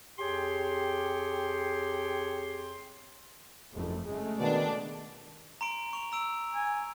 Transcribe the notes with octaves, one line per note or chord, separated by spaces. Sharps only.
F2 G4 G#4 C#5 G5 C6
F#1 F2 A3
C#3 G#3 A3
B2 D#3 D4 D5
A#5 C6 D7
C#6 F7
A#5 E6 D7
G#5